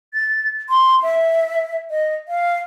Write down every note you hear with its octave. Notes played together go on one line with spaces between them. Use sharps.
A6
C6
E5
D#5
F5